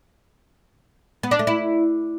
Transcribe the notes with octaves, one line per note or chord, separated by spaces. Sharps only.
B3
D4
A3
E4